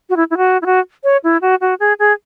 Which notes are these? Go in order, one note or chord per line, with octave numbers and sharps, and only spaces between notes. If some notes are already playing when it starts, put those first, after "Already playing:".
F#4
E4
E4
F#4
E4
F#4
C#5
E4
F#4
F#4
G#4
G#4